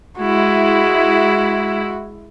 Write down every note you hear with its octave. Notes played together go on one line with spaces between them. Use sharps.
G#3 E4 F#4